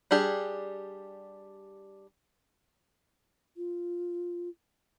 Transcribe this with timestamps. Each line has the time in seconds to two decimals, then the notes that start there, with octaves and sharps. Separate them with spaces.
0.11 G3 D4 G4 G#4
3.57 F4